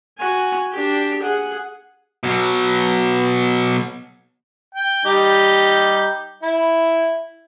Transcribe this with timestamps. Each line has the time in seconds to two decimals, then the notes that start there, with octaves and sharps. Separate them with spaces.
0.18 F#4 G#5
0.73 D4 G4
1.22 G#4 F#5
2.24 B2 F#3
4.74 G5
5.05 G3 D#4 G4
6.43 E4